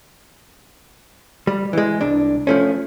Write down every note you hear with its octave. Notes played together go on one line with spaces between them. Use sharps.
G3
E3 G#3
C2 D4
F3 A3 C#4